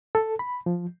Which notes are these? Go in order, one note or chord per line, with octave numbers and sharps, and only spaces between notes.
A4
B5
F3